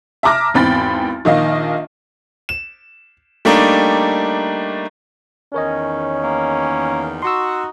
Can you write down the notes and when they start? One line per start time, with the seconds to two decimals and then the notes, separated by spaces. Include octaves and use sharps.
0.23 E5 A5 A#5 D6 F6 A#6
0.54 G#1 E2 C4 G5 B5 A6
1.25 A#1 D#3 D#5 F5
2.49 E7
3.45 G3 A3 A#3 D4 D#4
5.54 E2 D#3 C#4 A#4 C#5 D#5
6.23 A#3
7.22 D#4 F#4 C6 C#6 E6